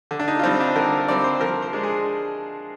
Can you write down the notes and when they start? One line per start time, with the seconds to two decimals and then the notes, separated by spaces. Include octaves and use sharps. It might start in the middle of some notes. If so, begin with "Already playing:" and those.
0.11 D3
0.19 D4
0.28 D#4
0.39 F4
0.43 G3 C4 D#4
0.60 D4
0.76 D3 A#4
1.08 G3 C4 D5
1.24 C5
1.40 F3 A#4
1.62 C5
1.73 G#3 D4
1.83 G#4